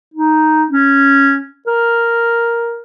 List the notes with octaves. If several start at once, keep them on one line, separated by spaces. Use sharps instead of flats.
D#4
C#4
A#4